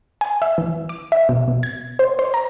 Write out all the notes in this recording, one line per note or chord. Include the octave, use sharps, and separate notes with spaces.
G#5
E5
E3
D6
E5
B2
B2
G#6
C5
C5
A#5